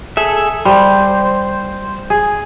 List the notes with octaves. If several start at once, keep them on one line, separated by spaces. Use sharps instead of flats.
G#4 A4 E5
G3 C5
G#4